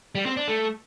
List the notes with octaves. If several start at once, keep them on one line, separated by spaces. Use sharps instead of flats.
G3
C4
D4
A3